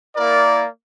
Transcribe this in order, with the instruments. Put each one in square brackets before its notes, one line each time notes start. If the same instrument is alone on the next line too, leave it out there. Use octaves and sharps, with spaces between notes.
[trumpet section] A#3 E4 A#4 D5